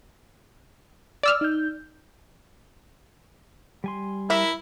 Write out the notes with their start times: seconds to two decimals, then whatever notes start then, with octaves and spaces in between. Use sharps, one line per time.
1.23 D5 E6 F6
1.41 D#4 G6
3.84 G3 G#5 C6
4.30 E4 A#4 E5